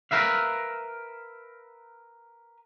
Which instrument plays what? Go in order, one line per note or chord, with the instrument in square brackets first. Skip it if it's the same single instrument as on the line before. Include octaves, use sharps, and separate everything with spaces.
[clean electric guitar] A#4 B4 E5 F5